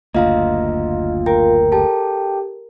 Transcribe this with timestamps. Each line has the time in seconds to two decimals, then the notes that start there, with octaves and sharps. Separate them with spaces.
0.15 F#1 D2 A#3 F4 D#5 F5 A#5
1.26 A#4 G5
1.72 G4 A4 G5 A5